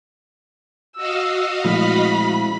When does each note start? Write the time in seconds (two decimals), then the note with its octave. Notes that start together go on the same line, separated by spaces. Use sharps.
0.95 F#4 D#5 F5 E6
1.65 A#2 F3 G#3 A3 C4 E4 B5